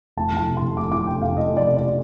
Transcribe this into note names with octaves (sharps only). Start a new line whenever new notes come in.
F1 A5
F3 A5
C3
C6
F2
F1 D6
F3 D6
C3 G5
F2 F5
F1 D#5
F3
D5
C3
D5